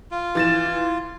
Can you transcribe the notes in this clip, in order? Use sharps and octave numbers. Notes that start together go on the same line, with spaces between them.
F4
E3 A6 E7